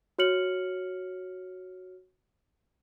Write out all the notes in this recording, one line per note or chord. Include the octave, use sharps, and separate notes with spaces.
F#4 C#5 F6 C#7 F#7